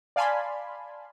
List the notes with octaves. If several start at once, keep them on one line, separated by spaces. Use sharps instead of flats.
D5 F5 G#5 A5 B5 C6